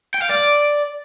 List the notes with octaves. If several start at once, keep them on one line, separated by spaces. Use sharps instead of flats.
G5
F5
D5